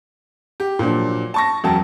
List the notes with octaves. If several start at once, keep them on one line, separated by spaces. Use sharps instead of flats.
G4
A#2 F3 F#3 D4
A5 C#6 A#6
E1 F#2 F#3 C#4 G5 A5